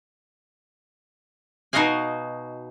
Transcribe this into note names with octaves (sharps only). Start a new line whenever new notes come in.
B2 D#4 F#4 D#5 F5 G#5